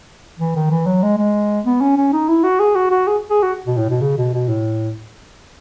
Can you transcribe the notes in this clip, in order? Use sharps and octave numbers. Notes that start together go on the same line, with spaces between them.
E3
D#3
E3
F#3
G#3
G#3
B3
C#4
C#4
D#4
E4
F#4
G#4
F#4
F#4
G#4
G#4
F#4
B2
A2
B2
C#3
B2
B2
A2